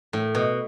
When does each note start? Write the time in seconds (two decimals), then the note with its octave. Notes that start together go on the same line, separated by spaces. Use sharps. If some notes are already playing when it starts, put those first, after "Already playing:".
0.13 A2
0.35 B2